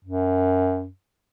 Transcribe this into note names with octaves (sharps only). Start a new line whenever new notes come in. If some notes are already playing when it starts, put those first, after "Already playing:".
F#2